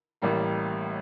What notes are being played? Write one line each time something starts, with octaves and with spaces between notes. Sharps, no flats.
A1 A2 G3 A#3